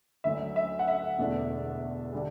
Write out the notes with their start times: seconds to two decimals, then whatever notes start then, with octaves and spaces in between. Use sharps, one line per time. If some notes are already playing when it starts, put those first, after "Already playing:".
0.24 D2 D3 F#3 E5
0.56 E5
0.79 F#5
0.88 E5
1.19 E1 E2 D3 A3 D4
2.13 D3 G3